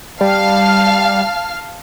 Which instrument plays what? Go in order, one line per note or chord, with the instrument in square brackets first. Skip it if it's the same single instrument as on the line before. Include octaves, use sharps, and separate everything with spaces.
[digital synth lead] G3 [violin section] F5 A5 F6